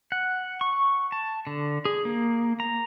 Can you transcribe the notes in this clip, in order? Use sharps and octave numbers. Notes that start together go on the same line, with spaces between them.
F#5
C#6
A5
D3
G#4
A#3
A#5